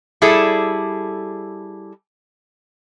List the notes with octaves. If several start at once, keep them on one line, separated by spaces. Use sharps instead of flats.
G3 E4 G#4 A4